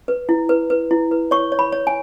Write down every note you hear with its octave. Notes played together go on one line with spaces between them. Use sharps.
B4
E4
B4
B4
E4
B4
C#5 C#6
C#5
B5
C#5
G#5